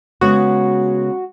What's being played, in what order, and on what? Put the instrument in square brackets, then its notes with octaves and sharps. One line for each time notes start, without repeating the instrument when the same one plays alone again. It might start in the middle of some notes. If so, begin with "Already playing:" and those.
[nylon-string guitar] C#3 G#3 B3 [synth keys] F#4